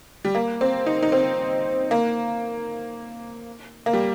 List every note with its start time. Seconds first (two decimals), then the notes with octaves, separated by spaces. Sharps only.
0.25 G3
0.35 A#3
0.61 C4
0.86 D#4
1.03 D#4
1.12 C4
1.91 A#3
3.86 A#3
3.93 G3